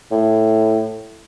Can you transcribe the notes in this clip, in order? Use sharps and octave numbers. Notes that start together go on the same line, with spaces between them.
A2